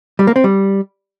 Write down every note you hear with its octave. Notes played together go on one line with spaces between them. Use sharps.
G3
A#3
C4
G3